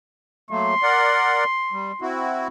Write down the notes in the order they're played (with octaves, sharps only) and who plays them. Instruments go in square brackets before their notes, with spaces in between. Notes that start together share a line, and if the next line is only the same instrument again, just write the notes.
[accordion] F#3 A3 A#3 [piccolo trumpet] C6
[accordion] A#4 D5 F#5
G3
C4 E4 F#4